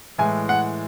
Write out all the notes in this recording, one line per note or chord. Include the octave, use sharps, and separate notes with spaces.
A2 E3 G#3 G#5
F#5